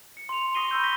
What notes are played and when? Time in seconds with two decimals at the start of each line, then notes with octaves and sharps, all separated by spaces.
0.17 C#7
0.29 C6 F7
0.55 C#6 D#6 A#6 C7 D#7 G7
0.71 B5 C6 E6 G6
0.84 A#6 B6 G7